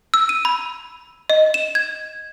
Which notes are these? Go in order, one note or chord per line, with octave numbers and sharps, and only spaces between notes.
E6
D#7
B5
D#5
E7
G#6